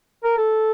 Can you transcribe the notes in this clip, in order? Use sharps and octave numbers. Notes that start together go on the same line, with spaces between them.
A#4
A4